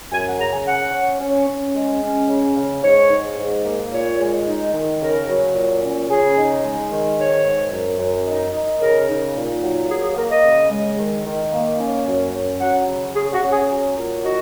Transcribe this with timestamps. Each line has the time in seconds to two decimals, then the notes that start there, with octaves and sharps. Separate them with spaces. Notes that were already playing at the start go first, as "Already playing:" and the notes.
0.12 F#2 G#5
0.26 F#5
0.39 C#3 A#5
0.52 G#5
0.66 C#4 F#5
0.93 C#4
1.20 C#4
1.47 C#4
1.75 G#3
2.02 C#4
2.29 C#3
2.57 C#3
2.83 G#2 C#5
3.10 G#2
3.38 G#2
3.65 A#3
3.92 A#2 C#5
4.19 G#3
4.46 D#4
4.73 D#3
5.01 C#3 A#4
5.28 F#3
5.54 A#2
5.82 C#4
6.09 C#3 G#4
6.36 D#4
6.63 G#3
6.91 D#3
7.18 G#2 C#5
7.44 G#2
7.72 F#2
7.99 F#2
8.27 D#4
8.54 D#4
8.80 C#3 A#4
9.08 D#4
9.35 A#2
9.63 F#3
9.89 A#3 G#4
10.03 G#4
10.17 A#3 A#4
10.29 D#5
10.44 C#3
10.70 G#3
10.98 D#3
11.26 D#3
11.53 A#3
11.79 C#4
12.07 F#2
12.34 C#4
12.61 F#3 F#5
12.87 C#3
13.15 C#4 G#4
13.33 F#4
13.42 C#4
13.52 G#4
13.69 F#3
13.96 A#2
14.23 D#4 F#4